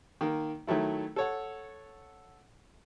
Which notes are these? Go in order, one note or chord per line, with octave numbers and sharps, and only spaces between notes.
D#3 A#3
D#3 F#3 A3 E4
A4 C#5 F#5